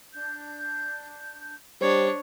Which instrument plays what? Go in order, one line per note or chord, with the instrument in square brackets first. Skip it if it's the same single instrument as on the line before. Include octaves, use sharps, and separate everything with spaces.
[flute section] D4 G6
[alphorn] G3 [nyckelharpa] D4 C#5 [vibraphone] C5